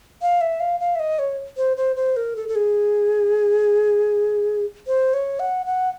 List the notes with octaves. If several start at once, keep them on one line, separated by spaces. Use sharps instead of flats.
F5
E5
F5
F5
E5
D#5
C#5
C5
C5
C5
A#4
A4
A4
G#4
C5
C#5
F#5
F#5